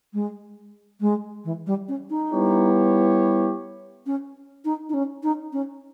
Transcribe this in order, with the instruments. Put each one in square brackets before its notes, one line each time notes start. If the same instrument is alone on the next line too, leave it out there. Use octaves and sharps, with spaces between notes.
[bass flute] G#3
G#3
E3
G3
C#4
D#4
[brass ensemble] G3 B3 E4 G4 C#5
[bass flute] C#4
D#4
D#4
C#4
D#4
C#4